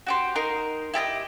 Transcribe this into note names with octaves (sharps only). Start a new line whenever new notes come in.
F#4 G4 C5
D#4 A#4 C6
E4 G4 A4 D#5